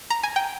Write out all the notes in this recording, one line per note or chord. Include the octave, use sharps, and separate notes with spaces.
A#5
G#5
G5